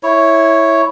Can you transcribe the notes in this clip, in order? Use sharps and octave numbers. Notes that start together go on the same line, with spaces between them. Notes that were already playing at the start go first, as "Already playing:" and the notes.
E4 C#5